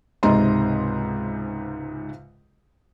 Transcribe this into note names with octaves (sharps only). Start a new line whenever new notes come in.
C#2 G#2 C3 D#5 A#5 C6